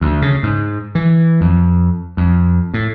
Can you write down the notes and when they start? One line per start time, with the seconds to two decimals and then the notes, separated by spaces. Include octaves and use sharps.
0.01 D2
0.22 C#3
0.43 G#2
0.95 E3
1.41 F2
2.17 F2
2.74 A2